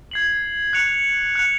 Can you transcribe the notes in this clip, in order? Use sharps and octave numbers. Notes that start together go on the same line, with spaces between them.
G#6 C7 F#7
F#6 C#7 F7
F#6 C#7 F7